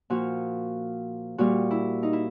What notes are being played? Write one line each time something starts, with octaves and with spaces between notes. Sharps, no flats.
A#2 F3 F#4
A#2 G3 F#4
E4
D#4
E4